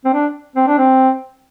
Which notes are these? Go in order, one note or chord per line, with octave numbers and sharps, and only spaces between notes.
C4
D4
C4
D4
C4